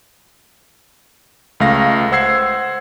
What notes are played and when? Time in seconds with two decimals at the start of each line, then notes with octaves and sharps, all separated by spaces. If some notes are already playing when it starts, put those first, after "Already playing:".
1.60 C#2 A3 F5 A#6
2.12 C5 F#5 E6 G#6 C7